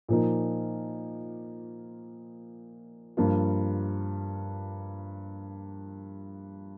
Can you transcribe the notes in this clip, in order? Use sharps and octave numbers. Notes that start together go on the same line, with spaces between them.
A#2 F3 A#3 D#4
G2 F3 A#3 F4